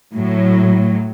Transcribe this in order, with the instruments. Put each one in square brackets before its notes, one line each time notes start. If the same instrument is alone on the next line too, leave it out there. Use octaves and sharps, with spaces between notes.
[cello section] A2 F#3